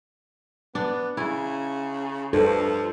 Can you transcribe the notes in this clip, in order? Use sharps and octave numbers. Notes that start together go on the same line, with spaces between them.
B3 D4
C#3 E4
G2 F3 A4